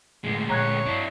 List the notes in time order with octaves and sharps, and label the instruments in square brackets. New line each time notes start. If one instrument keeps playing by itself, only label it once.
[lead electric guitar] D2 G#3 [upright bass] A2 A3
[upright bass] A#2 C#4 [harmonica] C#5 [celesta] A#5 F#6 G#6
[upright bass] G2 [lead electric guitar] D4 E4